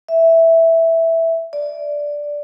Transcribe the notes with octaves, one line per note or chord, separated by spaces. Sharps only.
E5
D5